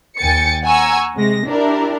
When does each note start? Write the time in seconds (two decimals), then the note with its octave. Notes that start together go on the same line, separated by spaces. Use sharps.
0.18 D#2 G5 G#5 A6 C#7
0.65 F#5 G#5 A#5 C#6 E6 G#6
1.15 C3 G#3 A#6
1.48 D4 E4 G4 A#4